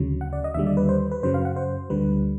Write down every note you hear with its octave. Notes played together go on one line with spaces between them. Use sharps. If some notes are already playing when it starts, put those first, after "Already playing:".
Already playing: D2 C#3 F#3
F#5
D5
D#5
D#2 D3 G3 E5
D5
B4
C5
B4
F#2 C#3 F#3 C5
F5
F#5
C5
D2 D3 G3 B4